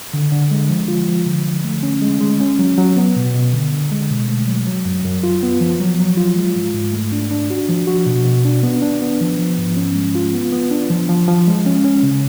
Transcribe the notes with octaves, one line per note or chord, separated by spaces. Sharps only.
D3
D3
G#3
F3
F4
F3
D3
D3
A3
C#4
G#3
G#3
C#4
F#3
F#3
B3
B2
B2
D3
D3
G#3
B2
A3
F#3
F#3
F#2
F#2
F4
B3
F3
F#3
F#3
F4
G#3
G#2
G#2
A3
D4
D4
F#4
F3
F#4
B2
B2
D4
B3
D4
B3
F3
F3
G#2
C#4
G#3
F4
B3
B3
D4
F3
F3
F3
G#3
C#4
C#4
C#3